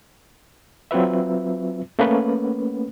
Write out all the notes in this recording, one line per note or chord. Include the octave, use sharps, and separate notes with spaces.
F#3 C4 F4 B4 E5
A3 A#3 C#4 B4